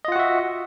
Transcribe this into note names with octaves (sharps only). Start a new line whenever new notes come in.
F4 F#4 D#5 E5 F#5